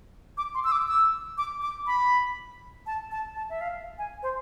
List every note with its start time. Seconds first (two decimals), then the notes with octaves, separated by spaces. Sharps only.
0.38 D6
0.55 C6
0.64 E6
0.72 D6
0.88 E6
1.38 D6
1.62 D6
1.87 B5
2.87 A5
3.11 A5
3.36 A5
3.50 E5
3.61 F5
3.98 G#5
4.23 C5